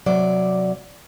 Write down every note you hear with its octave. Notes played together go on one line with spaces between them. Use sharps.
C3 F#3 D5